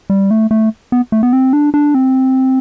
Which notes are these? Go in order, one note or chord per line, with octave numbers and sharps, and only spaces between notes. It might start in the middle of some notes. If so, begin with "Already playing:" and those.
G3
A3
A3
B3
A3
B3
C4
D4
D4
C4